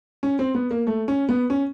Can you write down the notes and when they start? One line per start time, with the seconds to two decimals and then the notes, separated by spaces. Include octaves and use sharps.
0.23 C#4
0.39 C4
0.55 B3
0.71 A#3
0.87 A3
1.08 C#4
1.29 B3
1.50 C#4